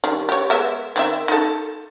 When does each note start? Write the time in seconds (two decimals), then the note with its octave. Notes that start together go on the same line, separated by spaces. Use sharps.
0.04 D#3 G3
0.29 G4 C#5
0.50 G#3 B3 E5
0.96 D#3 C4 E5
1.28 D#4 A4